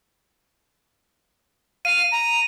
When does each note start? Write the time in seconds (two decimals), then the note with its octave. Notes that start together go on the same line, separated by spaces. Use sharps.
1.85 F5 D#7
2.12 A#5